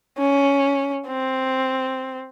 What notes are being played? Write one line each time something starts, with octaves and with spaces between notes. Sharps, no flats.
C#4
C4